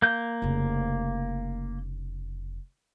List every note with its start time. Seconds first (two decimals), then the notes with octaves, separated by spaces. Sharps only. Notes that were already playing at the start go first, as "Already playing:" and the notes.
0.02 A#3 G6
0.42 F1 C#3